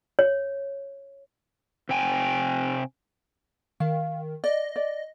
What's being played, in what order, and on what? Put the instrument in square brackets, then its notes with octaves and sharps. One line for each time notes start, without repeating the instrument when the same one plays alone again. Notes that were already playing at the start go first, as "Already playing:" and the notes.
[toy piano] C#5
[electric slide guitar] C3 G5 G#5
[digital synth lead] D#3 [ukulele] F5
[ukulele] D5 [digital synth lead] D#5
[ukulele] D5